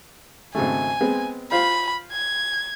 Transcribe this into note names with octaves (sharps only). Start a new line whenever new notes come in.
G#1 C#3 A3 G#5
G#3 B3 C4
F4 C5 F5 B5
G#6